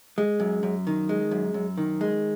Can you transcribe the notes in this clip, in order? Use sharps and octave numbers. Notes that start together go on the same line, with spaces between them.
G#3
F#2
F#2
D#3
G#3
F#2
F#2
D#3
G#3